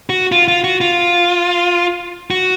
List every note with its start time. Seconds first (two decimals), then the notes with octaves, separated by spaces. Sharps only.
0.10 F#4
0.32 F4
0.48 F4
0.64 F#4
0.81 F4
2.31 F#4